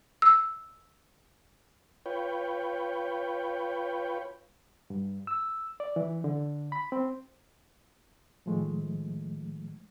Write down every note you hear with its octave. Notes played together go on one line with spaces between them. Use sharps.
E6
F4 B4 C#5 G5
G2
E6
D5
E3
D3
B5
C4
A2 D#3 F3 G#3 A3